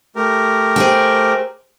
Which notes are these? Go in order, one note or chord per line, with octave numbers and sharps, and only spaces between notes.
A3 G4 A#4
G#4 C5 G5